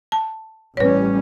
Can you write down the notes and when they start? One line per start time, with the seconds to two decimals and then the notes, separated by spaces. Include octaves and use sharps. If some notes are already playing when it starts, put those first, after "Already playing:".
0.12 A5
0.77 A1 G3 C#4 B4 C#5